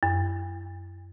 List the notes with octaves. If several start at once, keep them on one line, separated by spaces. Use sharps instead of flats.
F#2